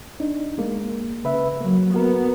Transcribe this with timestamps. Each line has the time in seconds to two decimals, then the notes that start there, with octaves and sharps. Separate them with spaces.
0.20 D4 D#4
0.58 G#3 A#3
1.24 C#3 B4 E5
1.60 F#3 A#3
1.94 B3 F#4 A#4